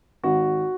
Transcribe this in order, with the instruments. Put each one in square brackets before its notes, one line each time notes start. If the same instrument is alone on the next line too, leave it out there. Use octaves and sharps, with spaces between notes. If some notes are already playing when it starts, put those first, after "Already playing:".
[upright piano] G#1 F#4